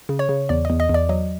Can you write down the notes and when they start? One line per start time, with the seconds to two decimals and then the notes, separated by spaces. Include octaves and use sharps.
0.09 C#3
0.19 C#5
0.29 C#3
0.49 E2 D5
0.65 E2 D#5
0.80 D#5
0.89 E2
0.94 D5
1.09 F#3 D#5